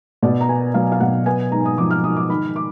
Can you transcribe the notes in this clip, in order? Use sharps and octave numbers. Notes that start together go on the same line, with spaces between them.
B2 D5
A#5
B3 G#5
F#3 F5
F5
B2 F#5
B3 G#5
G#2 A#5
D#6
F3 D6
F6
G#2 D#6
D6
D#3 B5
D6